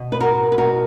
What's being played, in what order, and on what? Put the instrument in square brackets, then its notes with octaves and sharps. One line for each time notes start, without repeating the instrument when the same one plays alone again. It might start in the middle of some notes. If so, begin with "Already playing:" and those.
Already playing: [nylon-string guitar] B2
B4
F#4 A#4
B4
B2 F#4 A#4